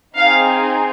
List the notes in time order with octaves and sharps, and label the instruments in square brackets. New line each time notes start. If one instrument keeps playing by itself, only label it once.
[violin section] C4 D#4 G#4 F5